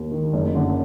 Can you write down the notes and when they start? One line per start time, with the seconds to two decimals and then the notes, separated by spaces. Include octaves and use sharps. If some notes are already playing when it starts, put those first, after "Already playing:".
Already playing: D#2 D#3
0.12 D#3
0.33 F#1
0.54 F#2 D3